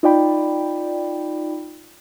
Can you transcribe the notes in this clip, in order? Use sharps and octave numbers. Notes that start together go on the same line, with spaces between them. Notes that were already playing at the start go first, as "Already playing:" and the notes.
D#4 F4 D5 G5 B5